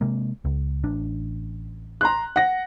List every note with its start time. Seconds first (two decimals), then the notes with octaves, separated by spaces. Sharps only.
0.01 C3 G#3 A#3
0.45 C#2
0.84 A1 D4
2.01 A#5 C6 F#6
2.36 F#5 A#6